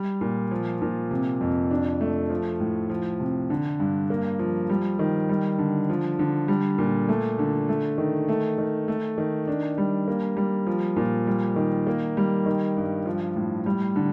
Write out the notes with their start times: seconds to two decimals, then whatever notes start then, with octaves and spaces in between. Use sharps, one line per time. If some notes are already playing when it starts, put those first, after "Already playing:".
Already playing: G3
0.21 A#2
0.51 F3
0.82 A#2
1.11 C3
1.41 F2
1.71 D4
2.01 A3
2.30 F3
2.60 A2
2.90 F3
3.20 C3
3.50 D3
3.80 G2
4.10 A#3
4.39 F3
4.70 G3
4.99 D#3
5.29 G3
5.59 D3
5.90 F3
6.19 D3
6.48 G3
6.78 A#2
7.09 A3
7.39 D3
7.69 A3
7.98 D#3
8.28 A3
8.58 D#3
8.88 A3
9.18 D#3
9.48 D4
9.78 G3
10.08 A#3
10.37 G3
10.67 F3
10.96 A#2
11.27 G3
11.56 D#3
11.87 A#3
12.17 G3
12.46 D#3
12.77 G2
13.06 F3
13.36 A2
13.66 G3
13.96 D3